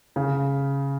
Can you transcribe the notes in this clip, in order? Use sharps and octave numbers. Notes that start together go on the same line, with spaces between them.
C#3